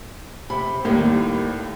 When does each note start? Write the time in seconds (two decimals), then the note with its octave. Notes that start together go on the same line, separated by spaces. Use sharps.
0.50 C3 B5
0.85 D#2 A2 G3 A#3 C4